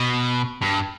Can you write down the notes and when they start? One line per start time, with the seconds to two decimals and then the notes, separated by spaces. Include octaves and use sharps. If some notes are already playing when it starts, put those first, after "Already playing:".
Already playing: B2
0.62 G2